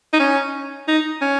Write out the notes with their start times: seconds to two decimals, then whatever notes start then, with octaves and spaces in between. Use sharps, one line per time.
0.13 D#4
0.20 C#4
0.88 D#4
1.21 C#4